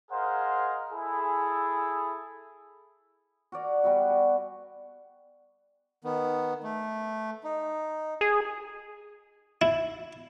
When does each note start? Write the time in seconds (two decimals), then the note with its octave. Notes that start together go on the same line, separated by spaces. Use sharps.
0.11 G#4 A#4 C5 D#5 F5 F#5
0.92 E4 G#4 A4
3.52 F#4 A#4 D5
3.84 G3 B3 F#4
4.09 G#5
6.04 D#3 B3
6.63 A3
7.44 D#4
8.21 G#4
9.61 E4